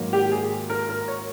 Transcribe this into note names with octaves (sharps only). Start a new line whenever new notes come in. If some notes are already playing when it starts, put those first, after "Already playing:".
Already playing: G#2 D#3 F#3 A#3
G4
G#4
A#4
A#4
C#5